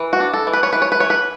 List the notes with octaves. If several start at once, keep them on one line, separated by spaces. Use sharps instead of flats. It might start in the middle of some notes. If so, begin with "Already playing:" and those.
Already playing: E3
F#4
D4
A4
E3
B4
C#5
E3 B4
C#5
B4
E3 C#5
B4